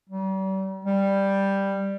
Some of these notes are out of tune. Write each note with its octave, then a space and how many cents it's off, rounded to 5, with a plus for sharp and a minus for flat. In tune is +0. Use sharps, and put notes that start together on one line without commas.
G3 -40
G3 +5